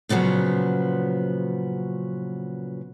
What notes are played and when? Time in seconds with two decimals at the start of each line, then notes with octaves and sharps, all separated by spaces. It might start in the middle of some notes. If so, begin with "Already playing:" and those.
0.09 A#2 C#3 F3 F#3 B3